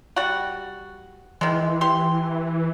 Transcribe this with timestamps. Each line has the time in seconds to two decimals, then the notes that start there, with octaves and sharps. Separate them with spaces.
0.16 G3 F#4
1.41 D#3 E3 G#3
1.81 G4 C6